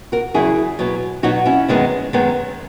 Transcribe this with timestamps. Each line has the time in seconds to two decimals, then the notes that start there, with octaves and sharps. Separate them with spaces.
0.12 F#4 A#4
0.34 E2 C#3 F#3 E4 G#4
0.79 B2 F#3 B3
1.23 B2 F#3 B3 D#4 F#4
1.45 C#4 E4
1.68 F#2 D#3 G#3 B3
2.13 F#2 D#3 G#3 B3